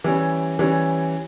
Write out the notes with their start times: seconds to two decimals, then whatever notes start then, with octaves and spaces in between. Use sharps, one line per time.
0.04 E3 G3 C#4
0.59 E3 G3 C#4